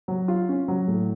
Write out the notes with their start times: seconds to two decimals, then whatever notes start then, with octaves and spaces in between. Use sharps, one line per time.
0.08 F#3
0.28 F4
0.49 C#4
0.68 F#3
0.88 A2